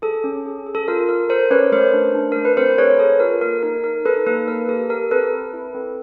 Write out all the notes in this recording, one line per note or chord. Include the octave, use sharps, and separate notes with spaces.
G#4 A4
C#4
G#4
G#4
A4
F4 A#4
A4 A#4
A4 A#4 C5
C#4 B4 C#5
A3 A#4 C5
D4
D4
A3 A#4
B4
C4 A#4 C5
G#4 B4 C#5
G#4 A4
F4 A#4
A#3 A#4
D#4 A#4
A4 A#4
D#4 A4 B4
A#3 A4 B4
A#3 A#4
G4 A4
G4 A#4
C4 A4 B4
C4
E4
C4